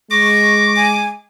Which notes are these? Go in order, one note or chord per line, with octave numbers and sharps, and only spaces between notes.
G#3 C#6 D6 A#6
G#5